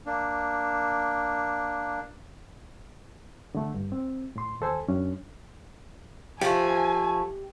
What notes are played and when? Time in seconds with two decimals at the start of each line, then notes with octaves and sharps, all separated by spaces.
0.06 A#3 D4
3.55 D3 A3
3.74 G2
3.92 C4
4.36 A2 C6
4.61 D#2 A4 C5 G#5
4.88 F#2 C#4 D4
6.41 F3 A3 G4 G#5